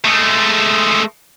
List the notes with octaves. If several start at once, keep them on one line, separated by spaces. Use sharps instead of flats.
G#3 A3